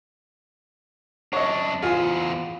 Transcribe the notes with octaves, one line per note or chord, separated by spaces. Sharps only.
F#2 D4 C#5 D#5
E2 F4 C5 G#5